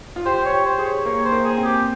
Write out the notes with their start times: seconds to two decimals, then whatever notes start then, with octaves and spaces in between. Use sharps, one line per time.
0.16 F4
0.26 G4 C5
0.45 C#5
0.52 G4
0.65 C5
0.79 G#4
0.85 C#5
1.05 A#3 C#5
1.25 C5
1.32 A#3
1.45 G#4
1.58 C4
1.65 G4